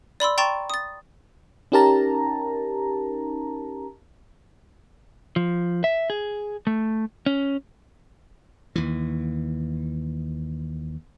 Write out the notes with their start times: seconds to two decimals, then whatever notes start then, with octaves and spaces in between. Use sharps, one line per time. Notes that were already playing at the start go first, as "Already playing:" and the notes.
0.20 D5 B5 C6 E6
0.38 G5 A#5 C6 C#6 A6 E7
0.70 D#6 A6
1.72 C#4 D#4 G4 A#4 A5 A#5
5.36 F3
5.84 E5
6.10 G#4
6.67 A3
7.26 C#4
8.76 D#2 E3